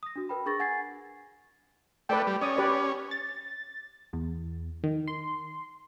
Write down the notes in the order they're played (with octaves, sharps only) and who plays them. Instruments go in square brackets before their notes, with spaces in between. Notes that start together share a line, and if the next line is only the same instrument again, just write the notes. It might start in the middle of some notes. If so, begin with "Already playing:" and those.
[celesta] D#6 A#6
D4 F#4
A#4 B4 G5 B5
D4 G#4 A#4 C#6 A6 A#6
F#5 G#5 G#6 A6 C7
[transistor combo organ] A3 [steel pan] B4 D5 G5
[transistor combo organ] G3
[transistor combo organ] C#4 [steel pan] D5 D#6
[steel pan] G4 B4 D5
[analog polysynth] A6
E2
D#3
C6